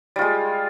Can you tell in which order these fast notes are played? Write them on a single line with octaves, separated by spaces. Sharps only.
G3 F4 G#3